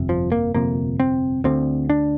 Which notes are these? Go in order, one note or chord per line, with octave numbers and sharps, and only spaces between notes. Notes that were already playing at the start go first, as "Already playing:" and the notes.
Already playing: G1 F2 C3
F3
A#3
G1 F2 C3 A#3
C4
D2 D3 C4
D4